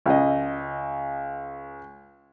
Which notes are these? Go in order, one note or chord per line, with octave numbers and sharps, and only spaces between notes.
C#2 D#5